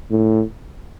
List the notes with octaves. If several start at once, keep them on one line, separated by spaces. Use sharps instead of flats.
A2